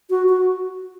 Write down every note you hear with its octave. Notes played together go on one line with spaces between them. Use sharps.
F#4
F#4